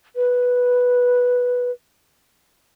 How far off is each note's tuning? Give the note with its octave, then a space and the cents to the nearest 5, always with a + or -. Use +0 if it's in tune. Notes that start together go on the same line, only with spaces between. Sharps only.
B4 -5